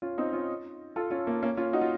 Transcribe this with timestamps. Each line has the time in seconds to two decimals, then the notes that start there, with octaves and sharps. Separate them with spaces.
0.02 C#4 F4
0.18 C4 D#4
0.33 C#4 F4
0.96 F4 A4
1.10 C#4 F4
1.27 A#3
1.43 A#3 C#4
1.57 C#4 F4
1.73 D#4 F#4
1.81 F4